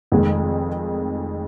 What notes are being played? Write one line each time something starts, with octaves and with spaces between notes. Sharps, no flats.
F1 F2 D#3 G#3